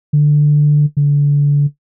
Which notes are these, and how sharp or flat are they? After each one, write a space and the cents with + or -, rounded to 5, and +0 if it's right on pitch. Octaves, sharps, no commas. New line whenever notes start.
D3 +10
D3 -30